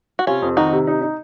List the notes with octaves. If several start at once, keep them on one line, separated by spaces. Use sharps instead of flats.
F#4
C3 C#4 F4
F2
D#3 D#4 F#4
C3
D#4
D#4